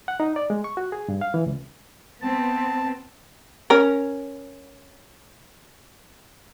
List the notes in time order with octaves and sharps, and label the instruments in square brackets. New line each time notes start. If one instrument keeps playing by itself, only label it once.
[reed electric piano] F#5
D#4
D5
G#3
C#6
F#4
G#4
G2
F5
E3
C#2
[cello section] B3 C4 [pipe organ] A5
[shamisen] C#4 A#4